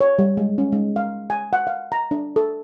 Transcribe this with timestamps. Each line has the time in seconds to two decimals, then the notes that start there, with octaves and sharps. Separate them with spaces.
0.01 C#5
0.19 G3
0.37 G#3
0.58 C#4
0.72 G#3
0.96 F5
1.30 G#5
1.53 F#5
1.67 F5
1.92 A#5
2.11 D4
2.36 A4